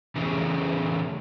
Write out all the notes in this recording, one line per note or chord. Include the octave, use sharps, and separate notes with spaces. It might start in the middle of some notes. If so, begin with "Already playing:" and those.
C#3 E3 A3 C#4 G4 G#4